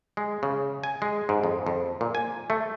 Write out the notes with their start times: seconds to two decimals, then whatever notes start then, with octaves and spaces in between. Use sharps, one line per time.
0.17 G#3
0.43 C#3
0.84 G#5
1.02 G#3
1.29 G#2
1.43 F2
1.66 F2
2.01 A#2
2.15 G#5
2.50 A3